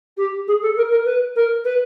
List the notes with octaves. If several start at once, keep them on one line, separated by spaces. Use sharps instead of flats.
G4
G#4
A4
A#4
A#4
B4
A#4
B4